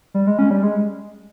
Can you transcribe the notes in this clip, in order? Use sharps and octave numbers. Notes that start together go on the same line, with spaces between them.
G3
G#3
C#4
G3
G#3